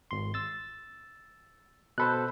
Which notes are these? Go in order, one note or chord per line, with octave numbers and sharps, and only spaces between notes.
G#1 C6
E6 A6
B2 A4 C5 B5 F#6